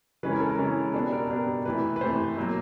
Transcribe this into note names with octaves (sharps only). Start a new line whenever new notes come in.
C#3 E3 G#3 C#4 B4
A#4
A4
A#4
C#3 E3 G#3 C#4
B2 G3 B3 D4 A4
A#4
B2 G3 B3 D4 A#4
C3 E3 A3 B4
B4
C3 E3 A3 C5
B2 F#3 A#3